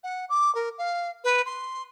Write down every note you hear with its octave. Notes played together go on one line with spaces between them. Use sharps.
F#5
D6
A#4
F5
B4
C6